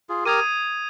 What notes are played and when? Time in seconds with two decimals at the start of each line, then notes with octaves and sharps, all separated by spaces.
0.09 F4 G#4
0.25 G4 A#4 D#6 G#6 D#7